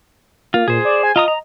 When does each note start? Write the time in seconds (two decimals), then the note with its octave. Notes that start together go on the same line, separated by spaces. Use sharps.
0.54 A#3 F4
0.68 A#2 G#4 C5
0.85 D5
1.03 G#5
1.16 F4 D#5 A#5 D#6
1.28 A#5